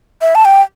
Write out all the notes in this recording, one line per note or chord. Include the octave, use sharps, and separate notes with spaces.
E5
A5
G5